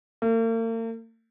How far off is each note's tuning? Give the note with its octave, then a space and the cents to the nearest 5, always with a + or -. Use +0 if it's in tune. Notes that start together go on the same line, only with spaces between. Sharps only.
A#3 -45